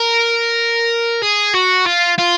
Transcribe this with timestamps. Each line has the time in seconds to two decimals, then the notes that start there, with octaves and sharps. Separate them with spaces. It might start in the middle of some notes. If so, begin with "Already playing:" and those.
Already playing: A#4
1.22 G#4
1.54 F#4
1.86 F4
2.18 F4